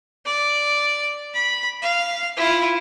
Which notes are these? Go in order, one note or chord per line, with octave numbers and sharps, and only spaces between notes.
D5
B5
F5
E4 F4